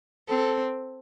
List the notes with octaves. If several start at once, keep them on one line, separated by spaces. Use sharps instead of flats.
C4 A4